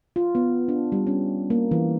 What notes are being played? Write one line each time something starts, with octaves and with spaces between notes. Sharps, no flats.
F4
B3
D4
G3
C#4
A#3
E3